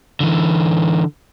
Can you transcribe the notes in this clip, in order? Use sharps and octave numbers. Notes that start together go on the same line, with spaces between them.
D3 E3